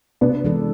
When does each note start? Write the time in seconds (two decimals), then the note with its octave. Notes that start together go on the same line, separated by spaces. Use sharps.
0.21 C3 B3 D4
0.44 E3 G#3 D4 A4